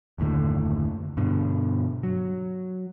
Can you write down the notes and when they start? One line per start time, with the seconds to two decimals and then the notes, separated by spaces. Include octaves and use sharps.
0.18 F#1 D#2 A2 D3
1.17 G2 B2 D3
2.03 F#3